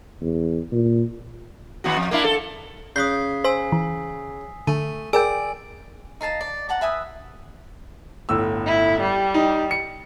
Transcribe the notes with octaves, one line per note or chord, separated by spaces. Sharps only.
E2
A#2
D#2 B3 F#4
F2
A#3 D4 E4
A4
C#3 D#6 F#6 G6 B6 C7
C5 G#5 E6 B6
E3
D3 A3 D#7
G#4 A#4 D5 G5 G#5 E6 D7
D#4 F5 A5 A#5
D5
F#5 A5 A#5
B4 E5 G#5 D#6
G1 A2 E6
E4
G3
D#4
C#7